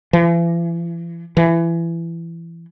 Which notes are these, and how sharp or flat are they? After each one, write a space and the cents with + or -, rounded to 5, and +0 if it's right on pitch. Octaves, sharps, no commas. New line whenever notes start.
E3 +45
E3 +25